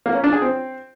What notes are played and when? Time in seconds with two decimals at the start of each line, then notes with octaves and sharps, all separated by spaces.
0.06 A#3
0.15 C#4
0.24 D4
0.33 G#4
0.42 C4